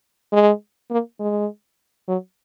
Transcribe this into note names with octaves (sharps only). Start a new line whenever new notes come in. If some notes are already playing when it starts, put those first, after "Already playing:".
G#3
A#3
G#3
F#3